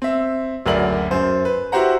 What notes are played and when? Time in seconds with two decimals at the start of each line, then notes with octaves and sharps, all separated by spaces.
0.02 C4 E5
0.66 F#1 D2 F#3 A#4 D5 F#7
1.11 F#2 C5
1.45 B4
1.72 E4 F#4 G4 C5 F#5 A#5